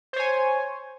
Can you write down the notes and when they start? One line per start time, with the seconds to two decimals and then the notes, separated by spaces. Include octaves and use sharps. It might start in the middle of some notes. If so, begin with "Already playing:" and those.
0.13 C5
0.16 C#5
0.20 G#5